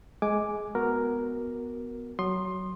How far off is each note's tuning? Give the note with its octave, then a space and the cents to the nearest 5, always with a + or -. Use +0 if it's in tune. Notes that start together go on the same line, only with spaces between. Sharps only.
G#3 +15 G#5 +0 D6 +0
B3 +0 F#4 -10 A#4 +0
F#3 +15 C6 +15 D#6 -25